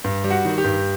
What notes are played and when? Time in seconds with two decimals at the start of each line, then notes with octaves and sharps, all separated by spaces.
0.04 G2
0.24 G3
0.31 F#4
0.45 D#3
0.58 G4
0.64 G2